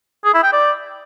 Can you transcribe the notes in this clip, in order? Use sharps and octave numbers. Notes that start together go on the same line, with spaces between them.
G#4
E4
G5
D5